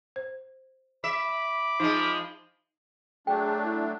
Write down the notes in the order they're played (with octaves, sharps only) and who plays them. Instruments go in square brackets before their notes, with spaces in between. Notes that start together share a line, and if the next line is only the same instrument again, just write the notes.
[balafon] C5
[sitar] E5 [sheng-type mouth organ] B5 D6
[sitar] F3 G#3 [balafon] D#4
[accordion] F#3 A3 D4 [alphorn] G#4 [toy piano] G5
[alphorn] E4